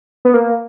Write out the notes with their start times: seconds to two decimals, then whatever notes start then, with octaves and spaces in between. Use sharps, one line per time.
0.25 B3
0.34 A#3